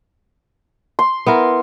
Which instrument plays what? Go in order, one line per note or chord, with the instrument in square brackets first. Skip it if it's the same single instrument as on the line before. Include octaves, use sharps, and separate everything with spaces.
[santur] C6
[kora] B3 E4 A#4